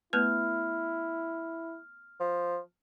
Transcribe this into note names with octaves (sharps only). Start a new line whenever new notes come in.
A3 B3 E4 B4 F6
F3